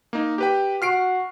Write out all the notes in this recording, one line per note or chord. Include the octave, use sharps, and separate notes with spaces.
A#3 D#4
G4 B4 G5
F#4 F6 C7 D7